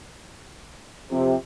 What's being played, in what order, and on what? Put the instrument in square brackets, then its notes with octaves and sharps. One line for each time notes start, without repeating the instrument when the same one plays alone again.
[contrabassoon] F2 [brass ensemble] C3